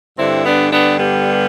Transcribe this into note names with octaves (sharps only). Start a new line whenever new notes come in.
G2 D3 C4 E4
B3 D4
B3 D4
G3 B3